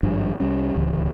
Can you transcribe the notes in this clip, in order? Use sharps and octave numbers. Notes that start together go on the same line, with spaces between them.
G#1 G2 F3 D4
C2 G3 C#4
D1 C#2 E3